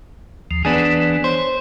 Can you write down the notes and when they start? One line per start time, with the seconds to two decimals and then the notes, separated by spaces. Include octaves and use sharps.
0.51 D#2 F3
0.65 E3 B3 D4 G#4
1.24 C5 C#5